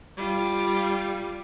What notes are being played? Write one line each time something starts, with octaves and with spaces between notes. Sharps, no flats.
G3 F4